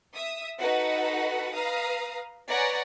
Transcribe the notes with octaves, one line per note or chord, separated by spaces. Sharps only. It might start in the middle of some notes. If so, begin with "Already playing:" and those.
E5 D#6
D#4 F#4 A4 B4 F#5
B4 F5 A#5 D#6
B4 C#5 D5 F#5 G#5 A#5